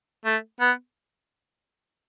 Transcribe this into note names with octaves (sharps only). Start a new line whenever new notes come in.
A3
B3